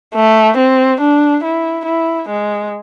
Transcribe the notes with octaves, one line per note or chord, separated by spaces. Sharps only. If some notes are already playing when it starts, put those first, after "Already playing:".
A3
C4
D4
E4
E4
G#3